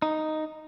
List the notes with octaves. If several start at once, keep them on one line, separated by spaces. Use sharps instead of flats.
D#4